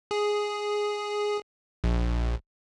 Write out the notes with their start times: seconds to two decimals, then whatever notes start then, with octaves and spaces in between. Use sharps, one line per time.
0.11 G#4
1.84 A#1